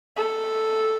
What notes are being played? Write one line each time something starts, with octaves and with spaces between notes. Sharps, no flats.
A4